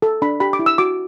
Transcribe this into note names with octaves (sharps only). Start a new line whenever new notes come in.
A4
D4 B5
G4 B5
D6
E4
E6
F#4 D6